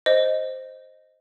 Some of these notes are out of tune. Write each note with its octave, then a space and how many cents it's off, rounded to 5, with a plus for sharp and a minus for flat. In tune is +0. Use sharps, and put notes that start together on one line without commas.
C5 +0 D#5 +0